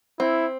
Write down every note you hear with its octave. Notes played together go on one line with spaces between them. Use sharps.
C4 E4